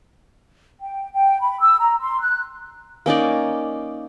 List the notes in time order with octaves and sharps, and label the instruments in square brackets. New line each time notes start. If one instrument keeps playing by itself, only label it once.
[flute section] G5
G5
B5
E6
A#5
C6
F#6
[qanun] A#3 C#4 D#4 D5